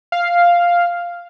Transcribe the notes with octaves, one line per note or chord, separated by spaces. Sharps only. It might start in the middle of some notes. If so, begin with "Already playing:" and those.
F5